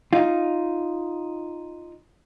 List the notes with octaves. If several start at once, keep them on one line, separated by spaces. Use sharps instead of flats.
D#4 F4